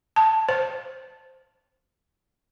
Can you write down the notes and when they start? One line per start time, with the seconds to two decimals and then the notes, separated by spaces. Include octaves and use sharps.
0.16 A5
0.49 C5